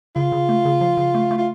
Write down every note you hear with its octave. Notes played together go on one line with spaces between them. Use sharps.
C#3 F4
C#3
A3
C#3
F3
C#3
A3
A3
F4